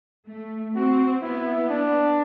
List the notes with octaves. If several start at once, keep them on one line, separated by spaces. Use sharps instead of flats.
A3
C4 F#4
B3 E4
D4